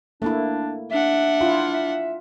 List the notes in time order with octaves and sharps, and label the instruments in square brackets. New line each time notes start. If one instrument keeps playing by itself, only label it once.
[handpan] A3 A#3 E4 [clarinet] D4
[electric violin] D4 F#5 [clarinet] E5
[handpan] E4 F4
[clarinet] E5